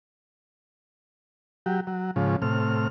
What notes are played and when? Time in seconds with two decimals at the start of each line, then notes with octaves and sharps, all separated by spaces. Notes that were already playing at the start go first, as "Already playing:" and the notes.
1.66 F#3 G4
1.87 F#3
2.16 G#2 C#3 F3
2.42 A2 C3 F6